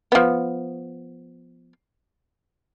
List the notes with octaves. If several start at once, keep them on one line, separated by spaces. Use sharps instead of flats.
F3 B3